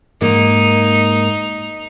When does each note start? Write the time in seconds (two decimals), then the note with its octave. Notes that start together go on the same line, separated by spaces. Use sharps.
0.21 G#2 A#3 D#4